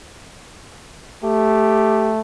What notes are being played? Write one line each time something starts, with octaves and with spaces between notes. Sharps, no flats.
A3 G4